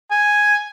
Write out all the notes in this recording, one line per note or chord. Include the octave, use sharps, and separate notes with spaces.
G#5